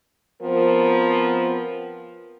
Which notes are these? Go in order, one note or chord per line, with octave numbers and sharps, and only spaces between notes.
F3 B3 C4 A#4